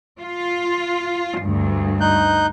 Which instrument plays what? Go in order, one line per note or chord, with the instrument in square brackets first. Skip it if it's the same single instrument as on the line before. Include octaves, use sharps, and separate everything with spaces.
[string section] F4
D2 G2
[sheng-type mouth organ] D#4 F#6 G6